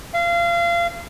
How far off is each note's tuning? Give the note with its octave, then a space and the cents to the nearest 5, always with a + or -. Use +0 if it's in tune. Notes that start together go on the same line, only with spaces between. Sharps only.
F5 -30